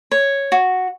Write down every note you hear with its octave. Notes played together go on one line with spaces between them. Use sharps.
C#5
F#4